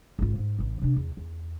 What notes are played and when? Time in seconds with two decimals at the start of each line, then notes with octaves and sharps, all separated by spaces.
0.19 G#1 F4
0.38 G#2
0.59 A1 E3
0.82 C3 D4
0.96 E2
1.17 E2